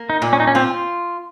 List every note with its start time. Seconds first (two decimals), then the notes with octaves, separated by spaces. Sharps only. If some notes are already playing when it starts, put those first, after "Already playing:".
Already playing: A#3
0.10 D#4
0.22 A#2
0.33 C#4
0.40 D#4
0.47 C#4
0.55 C4 F4